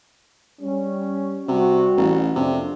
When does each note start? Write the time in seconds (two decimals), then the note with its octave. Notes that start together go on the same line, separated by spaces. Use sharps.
0.61 G3 C#4
1.48 C3 G3 F#4
1.97 A1
2.36 F2 C3 A#3 D4